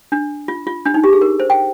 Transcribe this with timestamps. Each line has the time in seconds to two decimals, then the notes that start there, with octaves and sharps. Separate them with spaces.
0.12 D4
0.48 F4
0.67 F4
0.85 D4
0.94 D#4
1.04 G4
1.13 G#4
1.21 A#4
1.40 C5
1.50 G5